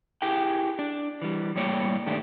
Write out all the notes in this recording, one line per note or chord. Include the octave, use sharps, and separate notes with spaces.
E4 G4 G#4 G5
D4
E3 G3
A2 G3 A#3 C#5 D5 G5
G2 D#3 A3 D4 G4